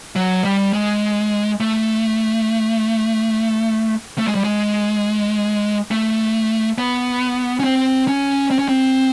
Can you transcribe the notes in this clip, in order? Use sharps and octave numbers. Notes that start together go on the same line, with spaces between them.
F#3
G3
G#3
A3
A3
G#3
G3
G#3
A3
B3
C#4
C4
C#4
C4
C#4
C4